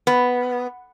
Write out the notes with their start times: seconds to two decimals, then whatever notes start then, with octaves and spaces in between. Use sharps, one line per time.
0.07 B3